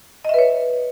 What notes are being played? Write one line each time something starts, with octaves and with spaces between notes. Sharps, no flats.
B4 C#5 D#5 E5